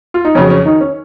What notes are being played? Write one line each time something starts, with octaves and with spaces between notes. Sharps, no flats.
F4
D#4
F2 C#3 F#3 C#4
C#4
D#3 D#4
C#4